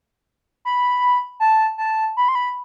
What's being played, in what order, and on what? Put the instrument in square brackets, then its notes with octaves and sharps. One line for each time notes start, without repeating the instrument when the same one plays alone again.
[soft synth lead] B5
A5
A5
B5
C6
B5